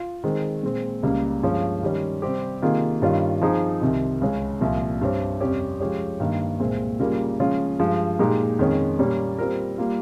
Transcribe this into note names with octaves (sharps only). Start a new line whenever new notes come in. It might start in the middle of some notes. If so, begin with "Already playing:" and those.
Already playing: F4
D#3 G#3 C4
A#2 G#3 C4
C#2 C#3 G3 A#3
G2 F3 G#3 C#4
D#3 G3 C#4
C3 G3 C4 G4
C3 D#3 A#3 F4 G#4
G2 D#3 G3 C#4 F4
F3 C4 D#4 G#4
C2 C3 D#3
C#2 C#3 G#3 C#4
C2 A#2 F3
G2 G3 C4 G4 C#5
F2 C3 G3 C#4 G4
F3 G#3 C#4 G4 C#5
G2 D#3 A#3
C2 A#2 G#3 C4
C#3 G3 A#3 F4 A#4
C#3 F3 G#3 C#4 F4
G2 F3 G#3
A#2 G#3 D#4 G4
F2 D#3 G#3 C#4
A#2 G3 A#3 C#4
G3 C4 F4 A#4
G3 A#3 F4